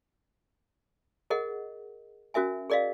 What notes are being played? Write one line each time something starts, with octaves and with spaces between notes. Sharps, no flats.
G#4 A#4 D#5 F#5
C#4 F#4 A#4 E5 G#5
G#4 A#4 D5 D#5 F5